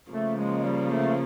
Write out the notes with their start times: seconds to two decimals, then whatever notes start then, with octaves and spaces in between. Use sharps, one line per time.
0.11 C#3 F3 A3 A#3
0.37 G#3
0.64 G3
0.90 A3